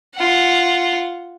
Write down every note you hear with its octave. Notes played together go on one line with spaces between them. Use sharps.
F4 F#5